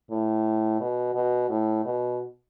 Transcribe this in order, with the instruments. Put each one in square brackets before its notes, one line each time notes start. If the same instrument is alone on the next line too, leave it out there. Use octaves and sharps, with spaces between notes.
[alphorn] A2
B2
B2
A2
B2